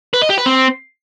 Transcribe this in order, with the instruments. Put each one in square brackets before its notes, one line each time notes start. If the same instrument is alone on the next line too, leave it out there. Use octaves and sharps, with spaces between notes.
[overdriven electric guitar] B4
D#5
G4
B4
C4